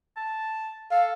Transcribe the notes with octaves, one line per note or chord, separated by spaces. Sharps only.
A5
A4 F5